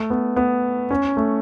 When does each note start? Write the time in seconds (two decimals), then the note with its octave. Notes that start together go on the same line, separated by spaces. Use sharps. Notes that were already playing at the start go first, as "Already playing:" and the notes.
Already playing: A3
0.10 B3
0.36 B3
0.90 C#4
1.17 A3